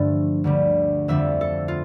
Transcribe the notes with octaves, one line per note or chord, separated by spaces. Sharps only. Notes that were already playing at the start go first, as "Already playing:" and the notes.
Already playing: G2 D3 F3 A3
D2 D3 G3
F2 D3 G3 E5
A4
F4